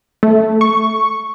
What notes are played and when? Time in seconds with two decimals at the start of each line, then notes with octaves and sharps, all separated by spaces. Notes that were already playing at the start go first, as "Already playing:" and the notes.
0.23 A3
0.61 C#6